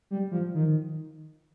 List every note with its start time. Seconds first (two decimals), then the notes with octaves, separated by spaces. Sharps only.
0.11 G3
0.31 F3
0.54 D#3